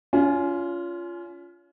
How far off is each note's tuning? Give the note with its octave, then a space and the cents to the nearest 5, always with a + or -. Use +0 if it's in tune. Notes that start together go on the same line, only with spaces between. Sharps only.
C#4 +35 F4 -10 G#5 +20